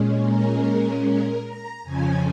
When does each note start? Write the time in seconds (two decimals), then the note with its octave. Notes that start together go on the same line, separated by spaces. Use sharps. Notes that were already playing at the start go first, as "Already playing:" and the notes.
Already playing: A#2 G#3 C#4
0.26 A#4
1.04 A#4
1.44 A#5
1.83 F2 C#3 F3 C#4 G#5